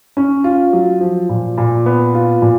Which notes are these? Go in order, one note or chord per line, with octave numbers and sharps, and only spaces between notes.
C#4
F4
F#3
F3
A#2
A#2
B3
F4
A#2